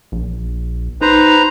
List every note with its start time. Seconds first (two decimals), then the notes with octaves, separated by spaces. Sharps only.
0.12 A#1
1.01 D#4 B4 C5 A#5